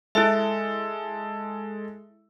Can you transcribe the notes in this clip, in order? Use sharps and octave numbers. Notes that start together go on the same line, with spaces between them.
G#3 E4 A4 E5